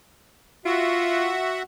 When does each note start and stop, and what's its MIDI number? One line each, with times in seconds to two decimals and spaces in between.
0.65 1.35 65
0.65 1.62 66
0.65 1.62 76
0.65 1.62 78